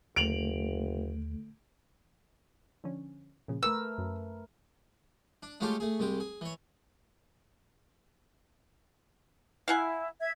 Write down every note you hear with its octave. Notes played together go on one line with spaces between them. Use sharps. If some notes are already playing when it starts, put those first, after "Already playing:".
F#1 D#2 D3 A3 D7 F7 F#7
D3 F3 C#4
A#2 C#3 F3
A3 A#4 B4 C#6 E6
F#2
D4
G#3 A3 C#4 F4 G4 A4
A3 G#4
C2 G#3 G4
G#4
E3 C#5
E4 F5 F#5 G#5
E5 G#6